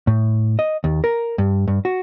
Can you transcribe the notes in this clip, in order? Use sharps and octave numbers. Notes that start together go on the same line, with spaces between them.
A2
D#5
D#2
A#4
G2
G2
F#4